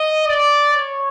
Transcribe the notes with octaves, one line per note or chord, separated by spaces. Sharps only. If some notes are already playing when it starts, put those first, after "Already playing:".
Already playing: D#5
D5
C#5